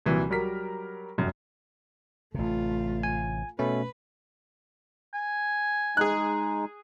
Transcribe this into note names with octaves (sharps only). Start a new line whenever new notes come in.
C2 A#2 E3 F#3
F#3 G3 A#4 B6
F1 F#2
A1 C3 A3 F4
G#5
B2 A3 C#4 B4
G#5
G#3 D#4 G#4 F#6